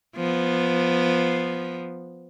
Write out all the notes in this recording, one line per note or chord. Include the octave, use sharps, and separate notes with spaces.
F3 B3